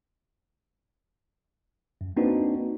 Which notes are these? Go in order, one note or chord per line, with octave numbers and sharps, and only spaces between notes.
F#2
A#3 C4 D4 D#4 F#4 B4